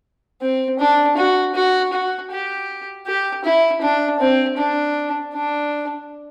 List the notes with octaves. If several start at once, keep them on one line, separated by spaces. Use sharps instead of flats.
C4
D4
F#4
F#4
F#4
G4
G4
E4
D4
C4
D4
D4